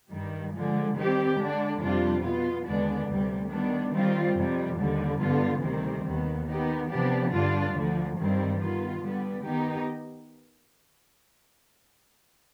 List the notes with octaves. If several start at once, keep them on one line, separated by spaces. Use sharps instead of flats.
G2 D#3 G3
D3 F3 G#3
D#3 G3 C4 G4
D3 G#3 D4
F2 C3 G3 D4 F4
B2 B3 F4
D#2 D3 G#3 B3 D4
D2 C3 G3
D#3 G3 B3 D4
D#3 G3 C4 F4
F2 C3 G3
D#2 D3 G3
G2 D3 G3 B3 F4
D2 C3 D#3 G3 C4
D#2 D#3 B3
D#3 B3 D#4 G4
C3 F3 B3 D4 G4
G2 D3 G3 D4 F4
D2 D3 F3
G2 D#3 G3 C4
D#3 B3 F4
D3 G3 B3
D#3 B3 D#4 G4